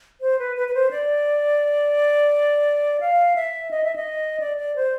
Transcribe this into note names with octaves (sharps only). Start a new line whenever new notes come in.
C5
B4
B4
B4
C5
D5
F5
E5
D#5
E5
D#5
D5
D5
C5